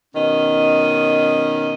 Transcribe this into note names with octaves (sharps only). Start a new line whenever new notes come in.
B2 D#3 C#4 D#5